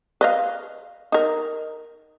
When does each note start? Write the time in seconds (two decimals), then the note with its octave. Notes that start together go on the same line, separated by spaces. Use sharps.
0.21 B4 D#5 F5
1.12 D#4 A#4